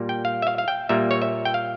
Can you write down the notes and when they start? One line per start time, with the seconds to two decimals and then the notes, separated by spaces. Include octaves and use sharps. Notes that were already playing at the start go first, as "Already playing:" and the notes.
Already playing: A#2 G3 A#3
0.09 G5
0.25 F5
0.42 E5
0.47 F5
0.58 F5
0.68 G5
0.89 A#2 G3 A#3 E5
1.11 C#5
1.22 E5
1.45 G5
1.54 F5